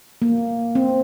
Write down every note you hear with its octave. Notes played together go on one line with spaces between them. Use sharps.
A#3
C4